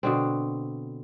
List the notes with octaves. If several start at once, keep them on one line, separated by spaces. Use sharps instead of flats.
B2 D3 C4